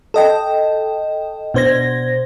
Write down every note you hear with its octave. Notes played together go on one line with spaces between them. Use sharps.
A4 D#5 G5
B2 D4 C5 G#6 A#6